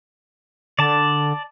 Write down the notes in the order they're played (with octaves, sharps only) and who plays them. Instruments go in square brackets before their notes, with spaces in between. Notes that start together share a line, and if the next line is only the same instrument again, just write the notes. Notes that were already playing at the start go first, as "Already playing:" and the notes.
[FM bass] D3 [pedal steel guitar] D5 A5